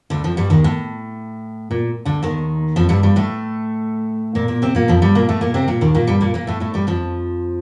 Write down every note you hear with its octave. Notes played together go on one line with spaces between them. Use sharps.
D2 D3
F2 F3
G2 G3
D#2 D#3
A2
A#2
D2 D3
D#2 D#3
F2 F3
G2 G3
G2 G3
A2 A3
A#2 A#3
A#2 A#3
C3 C4
A#2 A#3
F2 F3
G2 G3
A#2 A#3
A2 A3
A#2 A#3
C3 C4
A#2 A#3
D#2 D#3
A#2 A#3
G2 G3
A#2 A#3
A#2 A#3
A2 A3
A2 A3
G2 G3
F2 F3